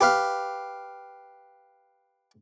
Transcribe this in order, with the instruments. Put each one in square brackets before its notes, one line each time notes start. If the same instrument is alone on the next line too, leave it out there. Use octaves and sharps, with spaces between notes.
[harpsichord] G4 B4 F5